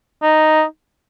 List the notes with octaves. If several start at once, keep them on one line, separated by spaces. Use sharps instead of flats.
D#4